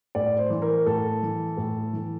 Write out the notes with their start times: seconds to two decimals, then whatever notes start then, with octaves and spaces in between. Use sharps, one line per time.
0.15 A2 D5
0.38 C5
0.50 E3
0.62 A#4
0.86 A2 A4
1.23 E3
1.57 A2
1.93 E3